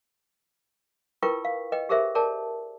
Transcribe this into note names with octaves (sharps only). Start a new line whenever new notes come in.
E4 F4 A#4 B4 G5 C#6
F5
B4 D#5 G5
G4 G#4 A#4 C5 E5
G#4 A#4 D5 A5